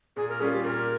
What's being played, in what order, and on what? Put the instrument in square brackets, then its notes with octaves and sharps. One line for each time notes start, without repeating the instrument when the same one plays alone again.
[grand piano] A#2 [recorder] G#4
[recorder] A#4
[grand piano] G3 C#4 F4 [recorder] G#4
[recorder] G4
[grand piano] A#2 [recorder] A#4